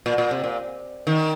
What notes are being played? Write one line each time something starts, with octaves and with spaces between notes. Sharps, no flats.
A#2
A#2
C3
A#2
D#3